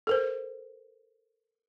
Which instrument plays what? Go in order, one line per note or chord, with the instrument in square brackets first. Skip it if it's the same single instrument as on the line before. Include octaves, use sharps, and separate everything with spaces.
[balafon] A4 A#4 C5